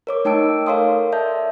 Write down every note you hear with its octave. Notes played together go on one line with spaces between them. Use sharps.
A#4 C#5 D6
A3 D#4 G5 A5 E6 D7
A4 A#4 C#5 F5 C6 D#6
D5 E5 A5 G6